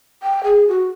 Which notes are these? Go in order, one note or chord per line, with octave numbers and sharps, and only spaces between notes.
G5
G#4
F#4